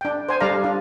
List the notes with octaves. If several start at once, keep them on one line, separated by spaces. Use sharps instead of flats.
D4 G5
C5 G#5
G3 D4 A4 D5 F5 A#5
D4 F4